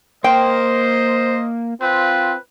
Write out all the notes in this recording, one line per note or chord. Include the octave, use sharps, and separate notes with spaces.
A#3 C5 D#5 G5
C4 F4 B4